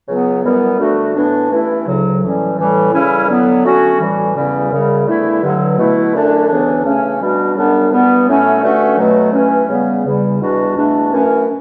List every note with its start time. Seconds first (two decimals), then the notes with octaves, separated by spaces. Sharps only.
0.08 C#2 C#3 F#3 B3
0.43 F#2 E3 G3 B3
0.78 D2 D3 A3 D4 F#4
1.15 A2 E3 B3 D4
1.50 G2 E3 A3 C#4 E4
1.86 D2 C#3 F#3
2.21 A2 E3 G3 C#4
2.57 A2 E3 G3
2.92 C#3 E3 G3 C#4 E4
3.27 D3 F#3 B3
3.63 D3 A3 C#4 F#4
3.99 A2 E3 G3
4.34 E2 C#3 G3 C#4
4.70 F#2 C#3 G3
5.06 E2 D3 A3 E4
5.41 G2 D3 F#3
5.77 B2 A3 E4
6.12 F#2 D3 A3 D4
6.48 D2 C#3 E3 B3 D4
6.84 C#3 E3 A3 C#4
7.19 B2 G3 D4 F#4
7.55 F#2 C#3 G3 B3 D4
7.91 G2 E3 G3 B3
8.26 A2 F#3 A3 C#4 E4
8.62 G2 D3 A3 C#4 F#4
8.97 B2 F#3 A3
9.33 G2 E3 A3 C#4
9.68 C#3 G3 B3
10.04 E2 C#3 G3
10.40 E2 B2 G3 D4 F#4
10.75 E2 B2 A3 D4
11.11 F#2 E3 A3 C#4